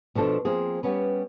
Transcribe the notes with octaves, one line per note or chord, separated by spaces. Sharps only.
B2 F3 D4 A4
F3 A#3 C4 G#4
G3 B3 C#4 B4